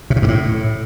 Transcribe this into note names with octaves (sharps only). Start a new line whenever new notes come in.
C3
C#3
G2
A2